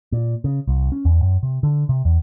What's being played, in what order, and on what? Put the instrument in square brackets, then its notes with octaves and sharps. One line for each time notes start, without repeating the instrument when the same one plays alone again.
[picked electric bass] A#2
C#3
C2
C#4
E2
F#2
C3
D3
C3
E2